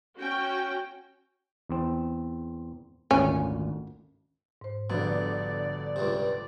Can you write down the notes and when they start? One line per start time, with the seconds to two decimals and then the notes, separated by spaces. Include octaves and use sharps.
0.17 C#4 F#4 G5
1.69 E2 C4
3.11 G#1 D2 A#2 C#4
4.61 G#2 C5
4.90 G1 B2 D3 F3 D5
5.96 C#2 G2 C3